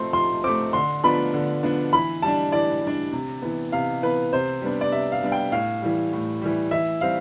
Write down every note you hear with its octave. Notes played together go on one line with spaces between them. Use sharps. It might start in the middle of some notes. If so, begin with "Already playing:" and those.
Already playing: F3 A3 C4 C6
F3 C6
A3 C4 D6
D3 C6
F3 B3 D4 B5
D3
F3 B3 D4
E3 B5
G3 D4 A5
E3 D5
G3 D4
C3
E3 B3
C3 F5
E3 B3 B4
C3 C5
G3 B3 D4
D5
C3 E5
F5
G3 B3 D4
G5
A2 F5
E3 G3
A2
E3 G3
E3 E5
G3 C4 F5